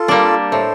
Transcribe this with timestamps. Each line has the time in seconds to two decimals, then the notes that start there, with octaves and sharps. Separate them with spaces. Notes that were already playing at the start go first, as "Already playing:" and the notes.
Already playing: F4 A4
0.08 G3 A#3 D4
0.52 A2 A4 C5